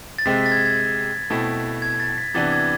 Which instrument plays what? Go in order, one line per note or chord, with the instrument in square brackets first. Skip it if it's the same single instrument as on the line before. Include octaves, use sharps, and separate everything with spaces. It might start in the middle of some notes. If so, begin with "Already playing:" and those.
[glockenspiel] A6
[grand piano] C3 G#3 C4 [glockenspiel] B6
[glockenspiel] B6
A6
G#6
G#6
[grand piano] B2 A3 C4 E4
[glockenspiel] G#6
A6
B6
[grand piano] C3 E3 B3 D4 [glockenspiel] A6
[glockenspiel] G#6